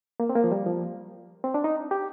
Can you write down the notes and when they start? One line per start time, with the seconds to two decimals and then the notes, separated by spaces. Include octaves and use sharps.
0.20 A#3
0.29 C4
0.36 A#3
0.44 F3
0.52 G3
0.66 F3
1.44 C4
1.54 D4
1.64 D#4
1.91 G4